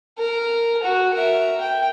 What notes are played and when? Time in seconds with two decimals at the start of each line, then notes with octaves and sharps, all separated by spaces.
0.18 A#4
0.83 F#4
1.14 A#4 E5
1.61 G5